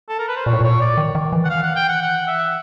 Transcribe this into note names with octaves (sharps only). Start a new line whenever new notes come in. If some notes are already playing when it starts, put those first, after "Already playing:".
A4
A#4
B4
C5
A#2 C#5
A2
A#2 C#5
D5
D#3
D#3
E3
F#5
F5
F#5
G5
F#5
F#5
E5